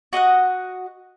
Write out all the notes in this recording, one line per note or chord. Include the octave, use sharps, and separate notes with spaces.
F#4 D#5 F5 F#5